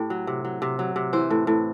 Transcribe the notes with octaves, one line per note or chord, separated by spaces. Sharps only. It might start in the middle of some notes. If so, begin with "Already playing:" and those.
Already playing: A2 G4
F#3
C3
F#3
C3
F#3
C3
E3 C5
A2
A2